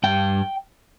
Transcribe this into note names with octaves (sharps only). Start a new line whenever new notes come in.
G2 G5